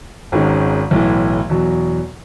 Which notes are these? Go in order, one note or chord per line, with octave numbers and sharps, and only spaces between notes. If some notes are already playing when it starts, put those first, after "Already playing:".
G#1 G#2 D#3 G#3 C#4
B1 A2 E3
E2 B2 F#3